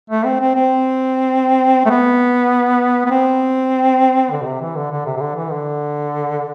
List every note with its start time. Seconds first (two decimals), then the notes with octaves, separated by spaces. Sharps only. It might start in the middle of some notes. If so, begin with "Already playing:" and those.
0.10 A3
0.25 C4
0.40 C4
0.55 C4
1.86 A3
1.90 B3
3.06 B3
3.11 C4
4.31 D3
4.41 B2
4.46 C3
4.61 E3
4.76 D3
4.91 D3
5.06 C3
5.17 C3
5.21 D3
5.36 E3
5.51 D3